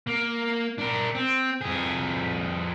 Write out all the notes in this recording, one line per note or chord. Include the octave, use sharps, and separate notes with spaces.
A#3
D4 A#4
C4
F2 G#4